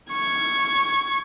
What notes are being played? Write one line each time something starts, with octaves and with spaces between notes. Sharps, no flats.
C#6 G#6